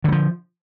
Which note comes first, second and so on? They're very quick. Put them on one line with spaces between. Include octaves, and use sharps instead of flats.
D3 F#3 F3